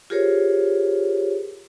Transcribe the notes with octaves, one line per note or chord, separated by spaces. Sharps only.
F4 G4 G#4 A#4 C5 C#5